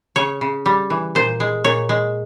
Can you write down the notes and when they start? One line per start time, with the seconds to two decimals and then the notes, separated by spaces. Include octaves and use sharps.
0.16 C#3 C#5
0.41 C#3
0.66 G3
0.90 E3
1.15 A#2 C5
1.40 G#3
1.64 A#2 C#5
1.89 G#3